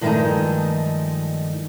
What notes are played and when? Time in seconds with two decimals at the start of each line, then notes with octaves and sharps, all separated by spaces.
0.01 G2 D#3 F3 G#3 A3 D#4